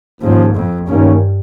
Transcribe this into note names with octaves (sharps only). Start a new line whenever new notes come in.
D#2 G#2 C#3 F3
F2
G2 D#3 A#3 C#4